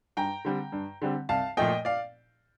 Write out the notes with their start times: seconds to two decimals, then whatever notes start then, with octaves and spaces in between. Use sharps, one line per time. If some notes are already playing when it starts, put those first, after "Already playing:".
0.17 G2 G5 A#5
0.45 D3 G3 C4
0.72 G2
1.02 D3 G3 C4
1.29 C2 F5 A5
1.57 A#2 F3 A3 D#5 G5
1.85 D5 F5